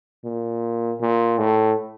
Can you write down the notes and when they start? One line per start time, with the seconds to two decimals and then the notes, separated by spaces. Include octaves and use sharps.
0.24 A#2
1.01 A#2
1.38 A2